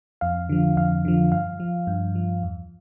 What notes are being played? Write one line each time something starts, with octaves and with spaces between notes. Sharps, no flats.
F2 F5
D3 F3
F2 F5
D3 F3
G2 F5
F3
G2
F3
E2